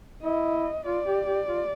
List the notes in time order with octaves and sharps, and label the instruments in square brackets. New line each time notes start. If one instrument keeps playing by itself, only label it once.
[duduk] E4 [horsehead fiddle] D#5
[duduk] F4 [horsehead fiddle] D5
[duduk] G4
G4
F4